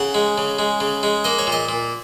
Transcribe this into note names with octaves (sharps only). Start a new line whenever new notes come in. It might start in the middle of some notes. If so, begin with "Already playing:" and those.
Already playing: C#3 F#5
G#3
C#3
G#3
C#3
G#3
A#3 D#5
C#5
A#2
D#5
A#2